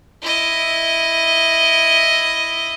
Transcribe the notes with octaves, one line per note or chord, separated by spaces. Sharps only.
E4 D#5